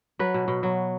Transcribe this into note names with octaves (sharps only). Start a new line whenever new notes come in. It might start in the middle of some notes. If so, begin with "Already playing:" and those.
F#3 B4
B2
B2
F#3